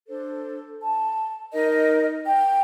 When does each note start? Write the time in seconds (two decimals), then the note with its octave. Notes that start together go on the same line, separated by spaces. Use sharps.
0.08 D4 A4 C5
0.80 A5
1.53 D#4 A#4 D#5
2.26 G5